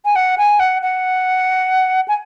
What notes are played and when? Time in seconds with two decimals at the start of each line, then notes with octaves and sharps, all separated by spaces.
0.05 G#5
0.16 F#5
0.38 G#5
0.60 F#5
0.82 F#5
2.08 G#5